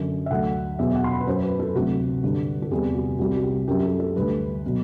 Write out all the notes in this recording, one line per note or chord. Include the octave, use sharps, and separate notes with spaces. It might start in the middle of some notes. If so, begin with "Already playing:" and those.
Already playing: F#2 D3 F#3
E5
D2 D3 F#3 F#5
E2 B2 F#3 E5
F#5
C6
B5
B4
F#2 F#3 C5
B4
A4
D2 C3 F#3 F#4
G2 D3 G3
A4
E2 C3 G3 G4
F#4
C2 C3 G3 F#4
F#4
G4
F#2 F#3 G4
G4
A4
A4
D2 D3 G3 B4
B2 F#3